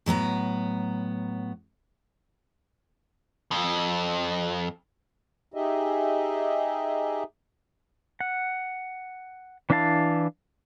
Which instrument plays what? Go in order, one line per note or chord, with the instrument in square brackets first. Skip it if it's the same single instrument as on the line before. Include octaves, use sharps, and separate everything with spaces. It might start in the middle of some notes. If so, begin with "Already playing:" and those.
[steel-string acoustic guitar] A2 F#3 B3 A#5
[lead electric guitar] F2
[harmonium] D#4 G4 G#4 D#5 E5
[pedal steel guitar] F#5
E3 D4 E4 F5 A5